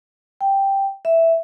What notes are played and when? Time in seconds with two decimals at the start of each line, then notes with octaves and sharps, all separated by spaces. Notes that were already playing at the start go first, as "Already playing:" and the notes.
0.41 G5
1.05 E5